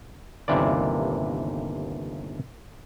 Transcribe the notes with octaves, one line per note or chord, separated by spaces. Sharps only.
G1 D#2 C3 E3 A#3 D5